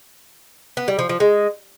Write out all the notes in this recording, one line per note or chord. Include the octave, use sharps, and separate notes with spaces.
B3
G3
F3
F3
G#3